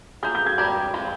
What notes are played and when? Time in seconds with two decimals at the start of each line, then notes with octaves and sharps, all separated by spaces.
0.23 A#3 F4 G#4 G6
0.35 G6
0.46 G#6
0.58 G3 D4 G4 A#4 D5 G#6
0.94 F3 G#3 C4 F4